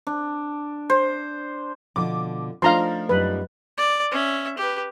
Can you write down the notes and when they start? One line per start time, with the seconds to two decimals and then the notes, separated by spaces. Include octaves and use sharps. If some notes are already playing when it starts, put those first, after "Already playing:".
0.07 D4
0.90 C5
1.96 B2 D3 F3 D6
2.62 F3 A3 D4 D#4 C5 F5 A#5 C6
3.09 F#2 G3 D#4 B4
3.78 D5
4.11 C#4 E5
4.58 G4 B4